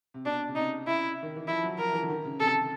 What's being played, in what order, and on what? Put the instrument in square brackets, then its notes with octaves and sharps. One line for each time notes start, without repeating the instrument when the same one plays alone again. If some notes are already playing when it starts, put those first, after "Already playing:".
[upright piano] C3
[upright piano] B2 [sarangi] D4
[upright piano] C#3
[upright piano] C3 [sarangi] D#4
[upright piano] C#3 [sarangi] E4
[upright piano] D#3
E3
[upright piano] F3 [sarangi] E4
[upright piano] F#3
[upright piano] F3 [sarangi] A#4
[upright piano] E3
D3
D#3
C#3
[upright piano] C3 [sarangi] A4
[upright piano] C3